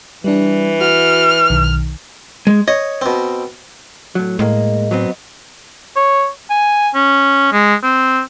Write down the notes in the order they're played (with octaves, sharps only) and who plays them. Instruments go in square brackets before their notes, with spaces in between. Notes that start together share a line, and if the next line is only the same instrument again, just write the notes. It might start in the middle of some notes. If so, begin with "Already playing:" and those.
[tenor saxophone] E3 [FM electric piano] G3 D4
[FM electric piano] F#4 [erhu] F6
[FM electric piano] B1 D#3
[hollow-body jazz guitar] G#3
[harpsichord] C#5 [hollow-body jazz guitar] D#5
[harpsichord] B2 C4
[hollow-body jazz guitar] A2 F#3
[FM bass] A2 [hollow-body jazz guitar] G#3 A#3 [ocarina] D#5
[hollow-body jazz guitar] F#3 B3 C4
[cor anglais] C#5
G#5
C#4
G#3
C4